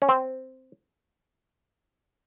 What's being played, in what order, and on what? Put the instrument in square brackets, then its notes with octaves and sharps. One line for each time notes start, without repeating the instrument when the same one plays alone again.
[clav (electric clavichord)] C#4
C4